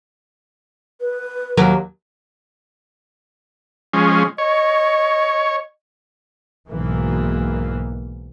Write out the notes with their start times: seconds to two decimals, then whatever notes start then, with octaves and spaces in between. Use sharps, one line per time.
1.01 B4
1.57 D#2 F#3 A#4
3.94 F3 G#3 C#4
4.38 C#5 D#5
6.70 B1 G#2 E3 A#3